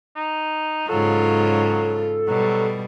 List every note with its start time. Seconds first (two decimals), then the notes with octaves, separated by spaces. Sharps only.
0.16 D#4
0.89 G#2 C#3 F#3 F4 A4
2.28 B2 F#3 G3